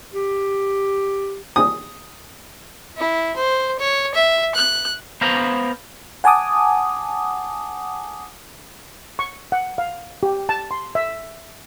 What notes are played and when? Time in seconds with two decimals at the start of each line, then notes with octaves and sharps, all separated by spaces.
0.13 G4
1.56 D#6
2.97 E4
3.36 C5
3.79 C#5
4.14 E5
4.55 F#6
5.21 B3 C5 F5 A#5
6.24 F#5 G#5 A5 D6 D#6
9.19 C#6
9.52 F#5
9.78 F5
10.23 G4
10.49 A5
10.71 C6
10.95 E5